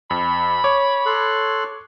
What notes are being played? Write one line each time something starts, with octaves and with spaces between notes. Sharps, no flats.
F2 B5
C#5 D6
A4 C6 F#6